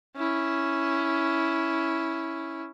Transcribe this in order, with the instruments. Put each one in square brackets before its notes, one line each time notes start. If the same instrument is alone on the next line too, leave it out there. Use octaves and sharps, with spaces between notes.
[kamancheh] C#4 E4